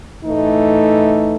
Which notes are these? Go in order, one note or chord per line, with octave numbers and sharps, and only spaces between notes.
A2 E3 A3 D#4